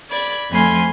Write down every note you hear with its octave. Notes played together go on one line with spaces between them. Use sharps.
D5 B5 G#6
F2 A3 G#5 B5 C6 F6